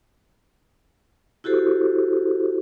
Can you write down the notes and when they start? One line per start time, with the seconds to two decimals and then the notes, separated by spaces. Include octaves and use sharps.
1.44 E4 F#4 G4 A4 C5